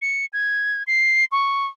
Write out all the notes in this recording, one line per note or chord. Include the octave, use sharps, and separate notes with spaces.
C#7
G#6
C7
C#6